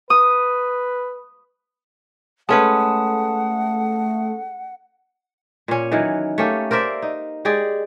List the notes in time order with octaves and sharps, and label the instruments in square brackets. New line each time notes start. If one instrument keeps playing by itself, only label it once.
[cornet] B4 [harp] D#6
[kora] G#3 C#4 B4 [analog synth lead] A3 [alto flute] F#5 [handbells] A5 D#6
[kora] A#2 C#4
D#3 E3 F#3
A3 A#3 C#4 G4
A#4 C5 D5 E5
D#4
G#3 G4 G#4 D5